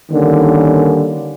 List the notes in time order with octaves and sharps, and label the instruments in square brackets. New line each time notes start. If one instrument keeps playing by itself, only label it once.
[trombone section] D3 D#3 G3 A#3 C#4